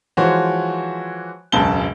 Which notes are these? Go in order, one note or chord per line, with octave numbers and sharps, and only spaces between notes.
E3 F3 G#3 F#4 C5 C#5
E1 C#2 F#2 A5 G7